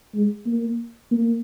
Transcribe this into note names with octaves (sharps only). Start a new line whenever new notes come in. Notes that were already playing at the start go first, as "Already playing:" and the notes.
G#3
A#3
A#3